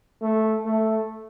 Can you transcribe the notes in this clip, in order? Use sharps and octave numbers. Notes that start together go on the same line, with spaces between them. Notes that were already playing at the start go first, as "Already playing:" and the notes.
A3
A3